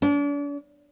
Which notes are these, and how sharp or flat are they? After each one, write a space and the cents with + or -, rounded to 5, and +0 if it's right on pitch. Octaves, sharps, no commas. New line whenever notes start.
D4 -40